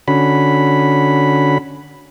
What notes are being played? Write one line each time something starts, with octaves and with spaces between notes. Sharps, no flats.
D3 C#4 F#4 B5